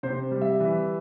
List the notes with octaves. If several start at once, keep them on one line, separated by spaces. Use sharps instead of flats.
C3 C5
G3
E5
E3